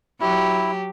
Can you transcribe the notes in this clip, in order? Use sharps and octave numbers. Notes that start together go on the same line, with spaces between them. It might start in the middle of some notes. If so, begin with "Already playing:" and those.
F#3 E4 G4